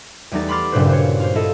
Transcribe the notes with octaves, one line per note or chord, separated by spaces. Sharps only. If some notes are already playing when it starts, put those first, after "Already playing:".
E2 G3 A3 D#4 A6
B5 C6 D6 F6 A6
F#1 G2 A#2 E4 B4 C5
C5 C#5
F4 C5
E4 A4 D#5